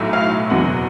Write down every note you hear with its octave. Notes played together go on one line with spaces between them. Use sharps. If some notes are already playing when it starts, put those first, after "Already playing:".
Already playing: B1 A2 F#3 A3
F5
F#1 E2 B2 F#3 F#5